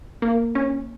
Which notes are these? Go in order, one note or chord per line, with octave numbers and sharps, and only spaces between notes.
A#3
C#4